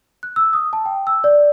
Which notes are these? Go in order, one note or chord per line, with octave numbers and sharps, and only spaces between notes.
F#6
E6
D#6
A5
G5
E6
D5